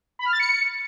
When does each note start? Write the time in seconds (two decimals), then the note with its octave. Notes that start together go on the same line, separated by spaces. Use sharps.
0.19 B5
0.26 F6
0.33 A6
0.40 C#7